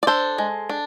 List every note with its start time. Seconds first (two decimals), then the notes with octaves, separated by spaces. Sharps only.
0.03 D5
0.07 D4 A4 C5
0.38 G#3
0.69 D4